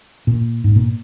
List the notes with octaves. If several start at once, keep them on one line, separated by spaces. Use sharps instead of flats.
A#2
G#2
A#2